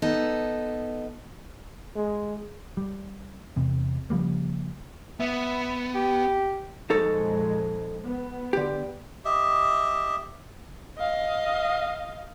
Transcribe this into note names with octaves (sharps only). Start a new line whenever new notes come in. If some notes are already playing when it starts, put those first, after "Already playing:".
B3 D#4 A4
G#3
G3
E2 C3
C#3 F3 G3 A#3
B3 E5
G4
F2 A#2 G#3 D#4 A4 C#5
B3
D3 G4
G4 D#5 E5
D#5 F5